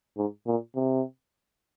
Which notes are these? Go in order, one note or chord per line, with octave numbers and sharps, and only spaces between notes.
G#2
A#2
C3